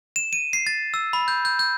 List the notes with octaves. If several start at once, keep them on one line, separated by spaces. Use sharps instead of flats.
E7
D#7
C7
A6
E6
B5
G6
G6
G6